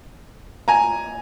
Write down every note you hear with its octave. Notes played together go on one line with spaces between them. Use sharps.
G#5 A#5